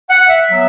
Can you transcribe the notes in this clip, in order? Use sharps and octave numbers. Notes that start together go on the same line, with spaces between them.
F#5
E5
F#3 B3